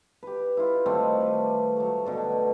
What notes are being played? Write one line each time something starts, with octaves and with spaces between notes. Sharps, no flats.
G4 B4
E4 F4
D#3 G3 A3 C4
B4
F#3 A3
B2 D3 A4